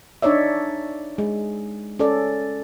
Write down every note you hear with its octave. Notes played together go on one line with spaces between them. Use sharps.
D4 D#4 C#5 D5 E5
G#3
C#4 A4 D5